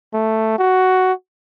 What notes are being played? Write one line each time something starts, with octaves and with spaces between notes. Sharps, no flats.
A3
F#4